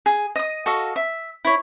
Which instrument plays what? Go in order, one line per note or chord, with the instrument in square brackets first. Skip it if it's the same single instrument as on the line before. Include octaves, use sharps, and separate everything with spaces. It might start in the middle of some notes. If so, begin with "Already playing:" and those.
[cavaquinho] G#4
D#5 D#6
F#4 A4 D#5 F5
E5
E4 C#5